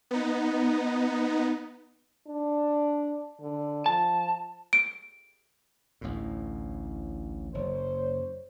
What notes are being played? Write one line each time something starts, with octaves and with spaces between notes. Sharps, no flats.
B3 D#4
D4
D3
F3 A5
D7
A1 D2 A2
F#1 C5 C#5